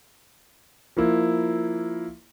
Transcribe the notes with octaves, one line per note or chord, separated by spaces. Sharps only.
F3 A#3 E4